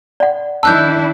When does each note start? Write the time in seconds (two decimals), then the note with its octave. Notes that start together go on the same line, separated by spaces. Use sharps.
0.20 D5 F#5
0.63 D#3 D4 E4 A5 E6 F#6 G6